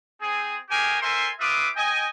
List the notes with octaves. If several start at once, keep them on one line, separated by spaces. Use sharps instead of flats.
C4 G#4
A3 A#3 G4 G#4 A#4 G#5
A4 A#4 C5 E5 G#5 C6
C4 F4 B4 E5 D6 D#6
D#5 G5 G#5